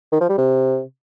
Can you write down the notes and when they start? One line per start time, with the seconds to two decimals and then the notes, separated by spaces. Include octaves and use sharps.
0.12 D#3
0.21 F3
0.29 G3
0.38 C3